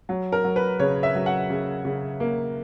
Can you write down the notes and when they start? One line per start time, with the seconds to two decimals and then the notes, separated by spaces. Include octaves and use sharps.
0.09 F#3
0.32 A#4
0.44 F#3
0.56 B4
0.80 C#3 C#5
1.03 E5
1.15 F#3
1.26 F#5
1.50 C#3
1.85 C#3
2.20 A#3